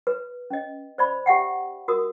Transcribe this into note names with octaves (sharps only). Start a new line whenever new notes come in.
B4
C#4 D#5
C5 D5 B5
G4 E5 F#5 G5
F#4 A#4 D#6